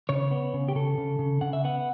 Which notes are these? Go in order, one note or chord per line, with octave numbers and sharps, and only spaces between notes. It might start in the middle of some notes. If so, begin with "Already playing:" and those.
C#3 C#5
B3
C#3
G4
C#3 A4
C#3
C#3
C#3 F#5
E5
B3 F#5